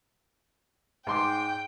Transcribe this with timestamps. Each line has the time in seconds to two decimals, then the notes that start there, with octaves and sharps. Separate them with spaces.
1.07 G#2 G5 C6 D6